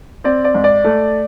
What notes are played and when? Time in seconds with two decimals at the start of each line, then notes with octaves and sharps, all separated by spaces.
0.24 C4 D5
0.44 D5
0.55 G#2
0.64 D5
0.84 A3